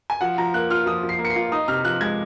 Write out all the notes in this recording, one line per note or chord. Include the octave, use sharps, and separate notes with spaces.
G#5
F3 F#5
F3 A#5
A#3 F#6
F4 F6
F3 D#6
F3
C7
A#3
C#7
C7
F4
D#4 D#6
C3 F6
F3 F#6
G#3 G#6